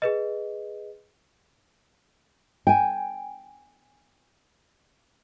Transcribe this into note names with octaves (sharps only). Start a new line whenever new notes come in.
G#4 B4 D#5
G5 G#5